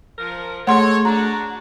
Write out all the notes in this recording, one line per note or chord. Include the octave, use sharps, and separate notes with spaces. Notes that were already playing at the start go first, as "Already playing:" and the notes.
F3 A#4
A3 G#4 A4 C#5 F#5 C6
D4 F#4 A#5